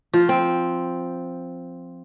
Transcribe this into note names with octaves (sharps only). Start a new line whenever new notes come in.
F3
C4